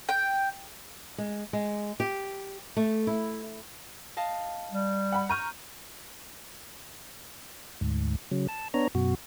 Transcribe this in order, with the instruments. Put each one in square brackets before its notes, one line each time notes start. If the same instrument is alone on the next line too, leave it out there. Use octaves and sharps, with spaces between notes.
[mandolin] G5
[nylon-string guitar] G#3
G#3
G4
A3
E4
[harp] D#5 F5 A5
[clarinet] G3
[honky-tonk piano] F#5 B5
[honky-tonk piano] A#5 C#6 F6 [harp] G6 D#7
[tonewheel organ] D2 G#2
C#3 F#3
A5
B3 D4 C#5 A#5
F#2 B2 F#4